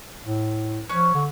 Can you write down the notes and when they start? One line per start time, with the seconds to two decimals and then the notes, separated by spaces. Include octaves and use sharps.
0.25 A2
0.89 F3 C#4 C#5 F#6
1.14 D3